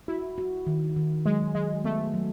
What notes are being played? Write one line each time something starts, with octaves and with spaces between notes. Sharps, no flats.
E4 F#4
F#4
D#3
D#3
F#3 G#3
F#3 G#3
A3 B3
F#3